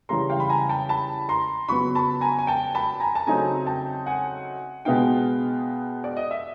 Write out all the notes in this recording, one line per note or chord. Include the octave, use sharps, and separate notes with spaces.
C#3 E3 G3 A#5 C6
F5 G5
B5
G#5 A#5
G5 A5
A5 B5
A#5 C6
C#3 F#3 B3 B5 C#6
A5 B5
G#5 A#5
G#5
G5 A5
A5 B5
G#5 A#5
A5
C#3 F#3 A3 C4 D#4 G#5 A#5
G5 A5
F#5 G#5
B2 G#3 B3 D#4 F5 G5
D5
D#5
E5